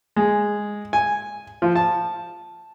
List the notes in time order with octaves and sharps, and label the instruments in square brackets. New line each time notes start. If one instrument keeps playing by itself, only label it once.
[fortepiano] G#3
G#5
F3
A5